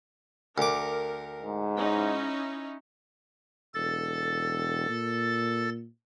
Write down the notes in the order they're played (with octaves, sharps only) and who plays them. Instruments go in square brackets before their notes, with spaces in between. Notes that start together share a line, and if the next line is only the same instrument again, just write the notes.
[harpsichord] D2 D6 [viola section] A#4
[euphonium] G#2
[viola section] C#4 D#4 E4
[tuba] E1 [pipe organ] A4 A6
[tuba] A#2